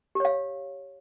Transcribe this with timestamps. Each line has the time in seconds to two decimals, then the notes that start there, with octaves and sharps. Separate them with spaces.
0.15 G4
0.20 C#5
0.25 F5